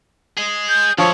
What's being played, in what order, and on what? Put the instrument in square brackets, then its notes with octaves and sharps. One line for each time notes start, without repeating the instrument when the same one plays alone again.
[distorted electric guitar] G#4 D#5
[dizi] G6
[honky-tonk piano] F3 [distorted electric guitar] G#3 A3 [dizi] C#5